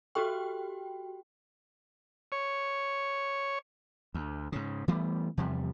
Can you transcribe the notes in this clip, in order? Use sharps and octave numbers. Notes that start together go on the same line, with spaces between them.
F#4 G4 A4 G5 C#6
C#5
D2
G#2 C#3
E3 G3 A3 B3
E2 C3 F3 G3